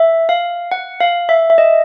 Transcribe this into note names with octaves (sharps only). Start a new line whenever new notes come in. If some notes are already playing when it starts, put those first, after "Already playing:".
Already playing: E5
F5
F#5
F5
E5
E5
D#5